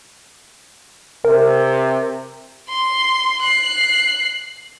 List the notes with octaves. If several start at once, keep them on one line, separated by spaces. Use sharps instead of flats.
C3 A#4
C6
F#6 C7